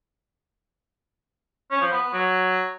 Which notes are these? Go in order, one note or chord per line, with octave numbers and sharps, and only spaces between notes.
C#4
F3
B3
B3
F#3